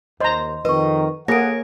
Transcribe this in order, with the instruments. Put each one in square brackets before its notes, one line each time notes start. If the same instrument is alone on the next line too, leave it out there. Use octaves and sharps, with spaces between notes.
[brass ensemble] D#2 [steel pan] C5 A#5 [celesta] D#5 C6
[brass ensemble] F2 D#3 [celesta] B4 C#6 [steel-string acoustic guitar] D#5
[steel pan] A#3 G#4 [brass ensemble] A4 F#5 [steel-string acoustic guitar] C#5 [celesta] A#6 D7